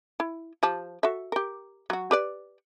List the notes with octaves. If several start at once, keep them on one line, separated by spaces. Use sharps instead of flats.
E4
F3 G4 A5
F#4 A4 E5
G4 A#4
F#3 F#4
G4 B4 D5